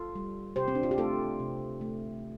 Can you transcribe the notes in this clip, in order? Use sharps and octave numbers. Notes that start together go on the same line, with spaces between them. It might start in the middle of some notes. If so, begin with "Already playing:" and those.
Already playing: F4 A4
G3
C3 G4 C5
C4
D4
F4
G4
A3 F4 A4
C3
A3